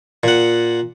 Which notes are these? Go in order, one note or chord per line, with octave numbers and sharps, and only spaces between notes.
A#2 F#5